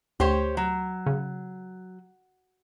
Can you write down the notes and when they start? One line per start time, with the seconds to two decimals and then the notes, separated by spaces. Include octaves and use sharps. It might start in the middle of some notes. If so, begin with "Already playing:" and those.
0.20 D2 G4 C5 C#5
0.57 F#3
1.06 C#3